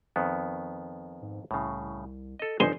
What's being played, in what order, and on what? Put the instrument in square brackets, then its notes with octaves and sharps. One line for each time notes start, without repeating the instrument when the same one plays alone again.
[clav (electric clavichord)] F2 D#3 B3
[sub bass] G#2
[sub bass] C2 [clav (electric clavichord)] A2 C#3
[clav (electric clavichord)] A4 D#5
[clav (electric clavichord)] G1 D#4 C5 [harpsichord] G2 G#5 C6